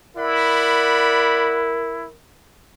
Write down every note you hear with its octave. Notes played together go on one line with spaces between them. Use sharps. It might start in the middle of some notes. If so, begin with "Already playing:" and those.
E4 A#4 D5 F#5 B5